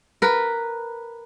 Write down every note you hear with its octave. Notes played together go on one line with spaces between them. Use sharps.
A#4 B4